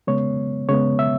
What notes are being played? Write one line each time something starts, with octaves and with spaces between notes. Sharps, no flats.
C#3 G#3 B3 C#5
C#3 G#3 B3 C#5
E5